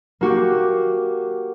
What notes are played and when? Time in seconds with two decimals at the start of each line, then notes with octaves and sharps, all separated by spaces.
0.21 A#3 F#4 G4